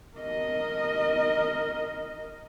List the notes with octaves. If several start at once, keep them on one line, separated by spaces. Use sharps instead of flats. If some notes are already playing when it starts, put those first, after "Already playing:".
A#4 D#5